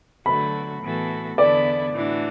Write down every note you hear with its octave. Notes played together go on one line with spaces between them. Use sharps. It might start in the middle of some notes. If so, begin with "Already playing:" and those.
D3 F#3 A3 F#4 A4 B5
A2 E3 B3 F#4 A4
E2 D3 B3 E4 A4 D5
A2 E3 D4 F#4